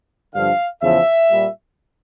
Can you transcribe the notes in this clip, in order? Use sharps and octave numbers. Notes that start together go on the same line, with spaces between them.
G2 D3 F3 F5
E2 C#3 F3 E5
A#2 G3